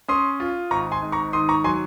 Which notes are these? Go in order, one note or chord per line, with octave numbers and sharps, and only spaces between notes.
C#4 C6 D#6
F4
G#1 A#5 C#6
G#5 C6
G#2
A#5 C#6
D#3 C6 D#6
A#5 C#6
F#3 G#5 C6